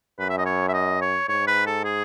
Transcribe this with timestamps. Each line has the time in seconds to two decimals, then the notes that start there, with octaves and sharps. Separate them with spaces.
0.19 F#2 B4
0.29 E5
0.38 D#5
0.46 C#5
0.68 E5
0.74 D#5
1.01 C#5
1.28 G#2 C#5
1.47 B4
1.66 A4
1.84 G#4